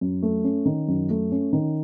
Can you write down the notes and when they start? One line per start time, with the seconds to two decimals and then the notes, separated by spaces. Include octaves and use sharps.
0.01 F#2
0.22 A3
0.44 C#4
0.66 D#3
0.88 F#2
1.10 A3
1.32 C#4
1.53 D#3